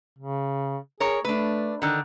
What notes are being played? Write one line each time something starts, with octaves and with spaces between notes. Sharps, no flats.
C#3
G#4 A#4 C#5
A3 D4 B4
D3 D#3